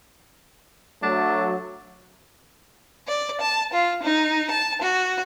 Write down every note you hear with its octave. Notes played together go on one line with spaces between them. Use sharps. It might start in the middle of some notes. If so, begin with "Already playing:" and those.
F#3 A3 D4
D5
A5
F4
D#4
A5
F#4